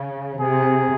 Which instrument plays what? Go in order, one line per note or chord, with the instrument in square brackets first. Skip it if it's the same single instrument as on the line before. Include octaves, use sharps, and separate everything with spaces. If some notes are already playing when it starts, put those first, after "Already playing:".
Already playing: [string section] C#3
[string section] C3 [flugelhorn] G#4